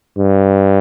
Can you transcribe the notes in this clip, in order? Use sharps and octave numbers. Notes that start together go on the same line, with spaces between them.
G2